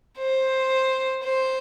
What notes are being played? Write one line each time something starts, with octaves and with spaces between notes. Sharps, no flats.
C5
C5